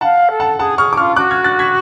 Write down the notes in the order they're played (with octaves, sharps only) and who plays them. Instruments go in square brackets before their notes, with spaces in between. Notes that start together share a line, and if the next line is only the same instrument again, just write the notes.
[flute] F5 [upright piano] F#5 A5
[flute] A4
[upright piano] F#5 A5
[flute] G#4 [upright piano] F#5 A5
[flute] G#4 [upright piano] C#6 F6
[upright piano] D6
[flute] F4 [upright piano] C#6 F6
[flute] F#4 [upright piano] D6 F#6
[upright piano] F6 G#6
F#6 A6
G#6 B6